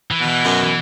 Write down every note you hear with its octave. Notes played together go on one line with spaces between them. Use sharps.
E3
B2
E3
F#2 F#3
E3